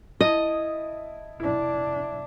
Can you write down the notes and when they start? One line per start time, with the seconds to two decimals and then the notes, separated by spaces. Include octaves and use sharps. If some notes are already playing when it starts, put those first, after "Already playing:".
0.21 E4 D#5 A5 D#6
1.40 F1 D4 E4